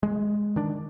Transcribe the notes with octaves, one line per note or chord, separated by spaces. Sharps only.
G#3
D#3 D4